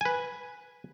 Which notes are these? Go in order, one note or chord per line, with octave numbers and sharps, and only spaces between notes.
B4 G#5